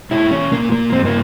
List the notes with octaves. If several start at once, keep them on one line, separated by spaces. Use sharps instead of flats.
A#2 E4
C#4
A#2 A#3
A#3
G2 C4
A#3